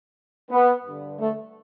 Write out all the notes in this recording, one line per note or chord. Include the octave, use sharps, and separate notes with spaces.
B3
G2 D3
A3